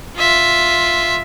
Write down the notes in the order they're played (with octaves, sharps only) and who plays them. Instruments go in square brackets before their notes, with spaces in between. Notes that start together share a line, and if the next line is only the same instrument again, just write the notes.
[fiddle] F4 E5